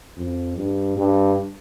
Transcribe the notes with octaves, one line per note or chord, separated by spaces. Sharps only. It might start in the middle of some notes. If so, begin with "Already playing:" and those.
F2
G2
G2